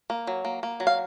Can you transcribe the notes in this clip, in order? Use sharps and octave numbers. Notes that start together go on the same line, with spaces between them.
A#3
F#3
A#3
A#3
F#3
F5